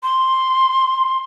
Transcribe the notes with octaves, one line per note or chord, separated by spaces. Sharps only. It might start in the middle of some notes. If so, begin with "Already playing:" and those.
C6